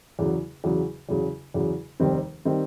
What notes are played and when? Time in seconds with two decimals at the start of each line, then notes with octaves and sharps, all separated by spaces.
0.19 E2 C#3 F#3
0.64 E2 C#3 F#3
1.09 E2 C#3 F#3
1.54 E2 C#3 F#3
2.00 F1 D#2 D#3 G3 C4
2.45 D#3 G3 C4